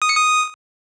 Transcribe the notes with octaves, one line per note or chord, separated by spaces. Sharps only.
D#6
C#7
D#6